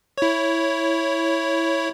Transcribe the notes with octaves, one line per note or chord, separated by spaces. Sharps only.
E4 C#5